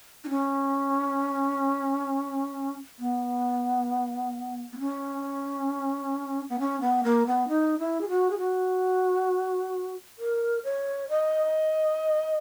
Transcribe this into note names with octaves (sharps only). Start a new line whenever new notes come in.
D#4
C#4
B3
B3
C#4
B3
C#4
B3
A#3
B3
D#4
E4
G#4
F#4
G#4
F#4
A#4
C#5
D#5